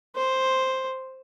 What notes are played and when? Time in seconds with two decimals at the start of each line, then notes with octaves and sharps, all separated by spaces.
0.15 C5